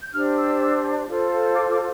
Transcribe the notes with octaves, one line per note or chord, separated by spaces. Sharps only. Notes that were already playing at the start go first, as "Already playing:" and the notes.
G6
D4 G4 C5 F6
E6
F4 A4 C5
D6
D6